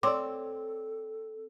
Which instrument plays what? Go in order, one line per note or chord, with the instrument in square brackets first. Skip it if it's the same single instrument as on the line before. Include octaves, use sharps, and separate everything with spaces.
[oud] C4 [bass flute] A4 [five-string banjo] C#5 D5 [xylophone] C6 D6